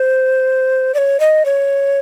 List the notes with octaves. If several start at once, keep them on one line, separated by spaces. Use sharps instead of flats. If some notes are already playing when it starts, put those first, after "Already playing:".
Already playing: C5
D5
C#5
D#5
C#5